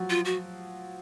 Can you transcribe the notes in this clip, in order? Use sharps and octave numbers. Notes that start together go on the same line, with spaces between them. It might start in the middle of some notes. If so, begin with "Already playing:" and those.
Already playing: F3 F#3 F#4
F4
F#4